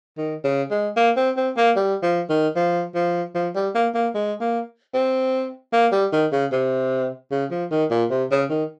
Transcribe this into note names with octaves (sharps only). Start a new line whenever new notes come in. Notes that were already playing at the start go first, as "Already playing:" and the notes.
D#3
C#3
G#3
A#3
C4
C4
A#3
G3
F3
D#3
F3
F3
F3
G3
A#3
A#3
G#3
A#3
C4
A#3
G3
D#3
C#3
C3
C#3
F3
D#3
A#2
C3
C#3
D#3